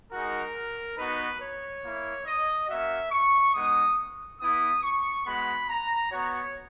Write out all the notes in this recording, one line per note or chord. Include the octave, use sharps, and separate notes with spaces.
G#3 D#4 F#4 A#4
B3 D#4 F#4 B4
C#5
A#3 E4
D#5
A#3 C#4 F#4 E5
C#6
G#3 B3 D#4 D#6
B3 E4 D#6
C#6
G#3 B3 F#4 B5
A#5
B3 F#4 C#5